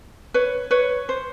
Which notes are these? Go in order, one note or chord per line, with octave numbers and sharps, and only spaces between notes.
B4 C#5
B4 C#5
C5